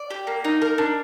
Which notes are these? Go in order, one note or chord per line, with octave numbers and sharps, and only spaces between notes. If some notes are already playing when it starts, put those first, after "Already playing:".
Already playing: D5
G4
A#3
D#4
A#4
D4